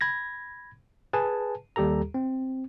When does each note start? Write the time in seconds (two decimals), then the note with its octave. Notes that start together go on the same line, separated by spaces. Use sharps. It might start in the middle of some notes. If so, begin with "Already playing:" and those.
0.01 B5 G#6 A#6
1.13 G#4 B4 G#5 A5
1.76 D#2 G3 G4 A4 A#5
2.14 C4